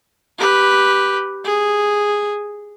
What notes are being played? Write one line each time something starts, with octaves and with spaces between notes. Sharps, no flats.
G4 B4
G#4